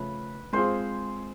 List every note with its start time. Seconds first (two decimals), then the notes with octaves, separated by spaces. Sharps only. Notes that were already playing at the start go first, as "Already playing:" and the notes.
Already playing: C#3 F3 A3 C#4 B4
0.53 G#3 C4 F4 G#4 C5